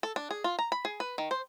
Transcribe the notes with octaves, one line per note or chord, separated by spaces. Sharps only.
A4
D4
G#4
F4
A#5
B5
G#4
B4
D#3
C5